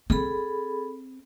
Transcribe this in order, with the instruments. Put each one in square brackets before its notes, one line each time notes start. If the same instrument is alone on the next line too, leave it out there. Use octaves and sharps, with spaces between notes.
[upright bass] C4 [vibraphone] G#4 A4 B5